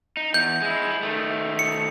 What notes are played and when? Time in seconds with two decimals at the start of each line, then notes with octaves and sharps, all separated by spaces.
0.17 D#4
0.34 E2 G6
0.62 G#3 E4
1.03 D#3 A3
1.59 C#7